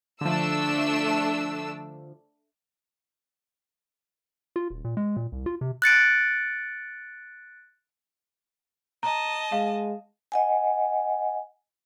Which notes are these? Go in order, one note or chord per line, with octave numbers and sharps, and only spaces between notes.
D3 F3 A3 D4 E6
F4
D#1
A#2
G#3
A#2
C2
F4
C3
F#6 A6 C#7 D7
D#5 A5 A#5
G#3 F5
D#5 F#5 G#5